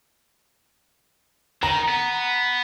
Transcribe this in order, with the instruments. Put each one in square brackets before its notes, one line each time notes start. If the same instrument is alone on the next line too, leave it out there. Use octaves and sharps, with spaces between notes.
[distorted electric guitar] D#3 [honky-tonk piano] A#5
[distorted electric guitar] B3